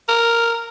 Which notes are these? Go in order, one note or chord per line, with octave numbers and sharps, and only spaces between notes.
A#4